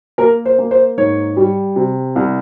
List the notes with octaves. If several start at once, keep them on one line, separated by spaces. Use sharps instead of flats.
A#3 A#4
C5
A#3
C5
G#2 C#5
G3
C3
C2